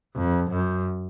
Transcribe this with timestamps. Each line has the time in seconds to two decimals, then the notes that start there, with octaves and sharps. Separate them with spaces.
0.15 F2
0.50 F#2